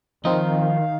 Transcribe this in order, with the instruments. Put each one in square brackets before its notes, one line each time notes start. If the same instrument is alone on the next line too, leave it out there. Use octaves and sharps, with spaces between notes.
[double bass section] D#3 [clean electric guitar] F3 [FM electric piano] C4 D#4 [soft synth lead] F5